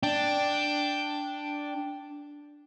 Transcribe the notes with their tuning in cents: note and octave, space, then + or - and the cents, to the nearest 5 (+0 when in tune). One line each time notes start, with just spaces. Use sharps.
D4 +0 G5 +0